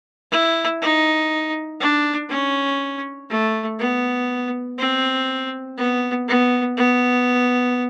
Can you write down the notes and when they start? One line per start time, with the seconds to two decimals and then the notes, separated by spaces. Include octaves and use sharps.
0.31 E4
0.81 D#4
1.80 D4
2.30 C#4
3.30 A3
3.79 B3
4.78 C4
5.78 B3
6.28 B3
6.77 B3